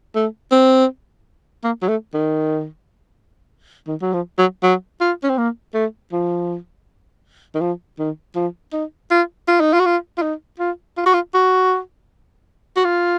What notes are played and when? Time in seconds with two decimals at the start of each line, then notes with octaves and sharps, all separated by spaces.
0.15 A3
0.52 C4
1.64 A#3
1.83 F#3
1.89 A3
2.14 D#3
3.88 D#3
4.02 F#3
4.13 F3
4.38 F#3
4.63 F#3
5.01 F4
5.23 C#4
5.30 C4
5.37 A#3
5.74 A3
6.12 F3
7.55 D#3
7.61 F3
7.99 D#3
8.36 F3
8.73 D#4
9.11 F4
9.48 F4
9.61 D#4
9.74 F4
9.80 F#4
9.86 F4
10.18 F4
10.22 D#4
10.60 F4
10.97 F4
11.06 F#4
11.14 F4
11.34 F#4
12.77 F#4
12.84 F4